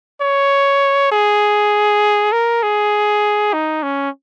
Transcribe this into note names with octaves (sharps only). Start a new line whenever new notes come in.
C#5
G#4
A#4
G#4
D#4
C#4